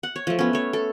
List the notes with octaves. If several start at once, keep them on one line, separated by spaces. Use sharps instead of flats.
F#5
C#5
F3 A3
B3 C#4
A3 C#5
A4